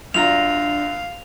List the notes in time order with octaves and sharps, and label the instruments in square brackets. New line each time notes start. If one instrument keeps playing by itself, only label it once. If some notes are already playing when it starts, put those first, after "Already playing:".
[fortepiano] F#2 F4 A#5 [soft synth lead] D4 [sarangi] F5 [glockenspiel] F7